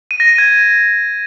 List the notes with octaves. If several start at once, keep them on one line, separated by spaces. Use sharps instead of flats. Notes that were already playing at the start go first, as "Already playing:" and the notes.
D#7
A#6
D#7
G#6